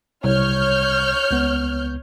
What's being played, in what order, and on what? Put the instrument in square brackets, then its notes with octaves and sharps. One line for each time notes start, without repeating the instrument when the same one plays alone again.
[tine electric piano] C2 [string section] C#5 F6 G6
[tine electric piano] C#2 B3